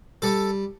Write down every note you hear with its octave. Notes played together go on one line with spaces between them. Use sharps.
G3 A4